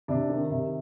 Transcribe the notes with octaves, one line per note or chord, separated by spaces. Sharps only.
C3 D4
D#3
C3